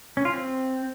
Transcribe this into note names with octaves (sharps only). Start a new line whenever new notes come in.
C#4
F4
C4